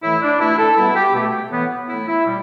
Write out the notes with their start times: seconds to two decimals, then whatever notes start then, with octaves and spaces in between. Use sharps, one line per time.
0.03 A2 E3 A3 E4
0.21 D4
0.40 B2 A3 E4
0.58 A4
0.77 B2 G3 B3 E4
0.95 G4
1.14 B2 A3
1.51 A2 E3 B3
1.88 A2 A3 E4
2.07 E4
2.25 B2 G3